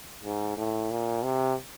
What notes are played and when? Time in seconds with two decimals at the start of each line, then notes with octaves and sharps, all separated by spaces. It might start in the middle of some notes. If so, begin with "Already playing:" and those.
0.24 G#2
0.57 A2
0.91 A#2
1.24 C3